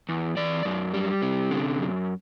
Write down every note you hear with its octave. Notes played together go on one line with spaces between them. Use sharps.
E2
E3 D5
F#2
G3
C3
D3
F#2